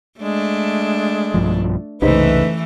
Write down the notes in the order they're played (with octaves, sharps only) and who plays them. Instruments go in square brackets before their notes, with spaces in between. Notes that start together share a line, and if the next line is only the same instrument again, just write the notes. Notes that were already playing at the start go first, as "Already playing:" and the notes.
[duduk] G#3 [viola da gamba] A3 D4
[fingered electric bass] B1 G2 F3
[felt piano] F#1 D#4 C5 [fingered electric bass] C2 [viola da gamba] E3 A3 [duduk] B4